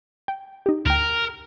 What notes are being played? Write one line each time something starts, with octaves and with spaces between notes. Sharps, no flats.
G5
D#4 G4
D2 A#4 G5